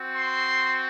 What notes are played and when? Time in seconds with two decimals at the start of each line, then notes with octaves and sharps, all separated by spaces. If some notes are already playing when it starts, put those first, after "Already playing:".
Already playing: C4 F#4
0.14 C6